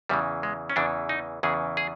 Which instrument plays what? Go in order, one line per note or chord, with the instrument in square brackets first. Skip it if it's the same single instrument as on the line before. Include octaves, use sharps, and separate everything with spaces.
[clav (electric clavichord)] E2 C#3 E3 G3
G#3
C#4
E2 C#3 E3 D4
D#4
E2 C#3 E3 G#4
G#4